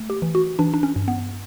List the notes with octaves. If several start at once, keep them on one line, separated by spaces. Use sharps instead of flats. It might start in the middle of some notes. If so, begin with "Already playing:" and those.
Already playing: A3
G4
E3
F#4
E3 D4
D4
C#4
G2
B3